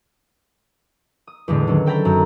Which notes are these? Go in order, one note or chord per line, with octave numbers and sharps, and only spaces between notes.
D#6
E2 A2 D3 G#3
D3 D#3 F#3 C#4
A4 G5 A#5 B5
F#2